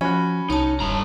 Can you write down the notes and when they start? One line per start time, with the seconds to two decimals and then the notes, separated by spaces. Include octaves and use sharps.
0.01 F3 C#4 F#4 B5
0.50 C2 D#4 C#5 A5
0.80 E1 G2 A#5